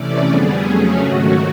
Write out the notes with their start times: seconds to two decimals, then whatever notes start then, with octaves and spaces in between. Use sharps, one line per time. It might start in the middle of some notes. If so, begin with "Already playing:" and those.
Already playing: C3 E3 A3 C#4 D5
0.28 F2 D3 G3 B3 G#4
0.65 F2 C#3 F#3 A3 C#4
1.01 G#2 D#3 F#3 A3 F#4